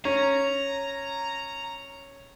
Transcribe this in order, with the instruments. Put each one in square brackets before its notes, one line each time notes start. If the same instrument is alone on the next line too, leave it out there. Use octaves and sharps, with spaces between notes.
[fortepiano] C#4 [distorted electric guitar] A#5